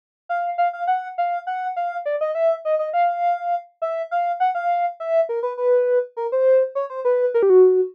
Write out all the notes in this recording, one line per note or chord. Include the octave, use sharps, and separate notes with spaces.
F5
F5
F5
F#5
F5
F#5
F5
D5
D#5
E5
D#5
D#5
F5
E5
F5
F#5
F5
E5
A#4
B4
B4
A#4
C5
C#5
C5
B4
A#4
G4
F#4